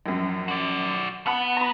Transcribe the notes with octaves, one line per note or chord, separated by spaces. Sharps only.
A#1 F#2
F#4 D5
B3 F#5 A5 B5
A#5 B5